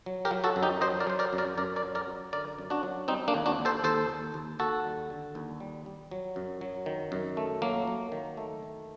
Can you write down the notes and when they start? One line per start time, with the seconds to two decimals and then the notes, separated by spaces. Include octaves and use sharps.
0.06 F#3
0.25 G4 A#4
0.31 F#3
0.44 F#4 A4
0.56 F#2
0.63 D#4 G4
0.81 F#3 C5 D#5
1.00 A#4 D5
1.07 F#3 C5
1.19 A#4 D5
1.33 F#2
1.38 A#4 D5
1.58 F#2 A#4 D5
1.76 A#4 D5
1.83 F#3
1.95 A#4 D5
2.07 F#2
2.32 D3 A#4 D5
2.59 F#2
2.70 D4 F#4
2.83 F#3
3.08 G3 C4 D#4
3.28 A#3 D4
3.34 D#2
3.46 D4 F#4
3.59 D#2
3.65 A4 C5
3.84 D#2 A4 C5
4.09 D#2
4.34 D#2
4.59 D#2 F#4 A4
4.84 G3
5.10 D3
5.35 D#2
5.60 G3
5.86 G3
6.11 F#3
6.36 F#2
6.61 F#3
6.86 D#3
7.12 F#2
7.37 A3
7.62 F#3 A#3
7.87 F#3
8.12 D#3
8.37 A3
8.63 D#3